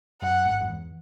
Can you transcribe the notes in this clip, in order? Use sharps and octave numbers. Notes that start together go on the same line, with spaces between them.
F#2 F#5
G#1 G#2
F#2
E2